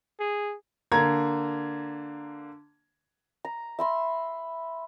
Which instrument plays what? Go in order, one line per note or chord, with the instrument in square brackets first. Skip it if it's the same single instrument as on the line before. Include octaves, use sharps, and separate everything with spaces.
[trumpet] G#4
[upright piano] D3 A#3 A#5 G#6
[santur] A#5
E5 B5 C6